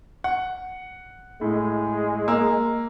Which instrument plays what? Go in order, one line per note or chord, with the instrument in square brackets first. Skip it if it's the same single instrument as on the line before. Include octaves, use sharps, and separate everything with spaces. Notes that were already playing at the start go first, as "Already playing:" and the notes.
[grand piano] F#5
[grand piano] A2 [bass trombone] G#3
[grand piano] A#3 E6